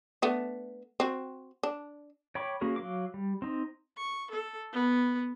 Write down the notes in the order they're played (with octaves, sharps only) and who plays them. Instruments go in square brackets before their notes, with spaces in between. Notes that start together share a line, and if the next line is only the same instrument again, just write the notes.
[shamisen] A3 B3 D4
C4 F#4
D4
[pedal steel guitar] C#5 G5 B5 C#6 D6
A#3 C#4 F#4 G#4 A#4
F#3 F5 D6
G3
C4 D#4
[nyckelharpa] C#6
A4
B3